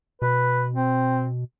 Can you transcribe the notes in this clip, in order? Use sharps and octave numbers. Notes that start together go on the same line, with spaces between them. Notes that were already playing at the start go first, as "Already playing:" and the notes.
B2 B4
C4